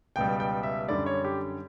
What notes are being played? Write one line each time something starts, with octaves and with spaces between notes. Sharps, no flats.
C#2 B2 G3 G5
G5
E5
F#2 D3 G3 D5
C#5
G4